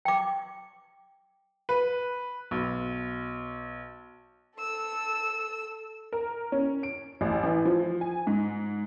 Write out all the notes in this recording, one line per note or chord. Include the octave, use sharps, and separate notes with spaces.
G5 D6
B4
B1
A4 E6
A#4
C#4
D7
A1
E3
F3
G#5
G#2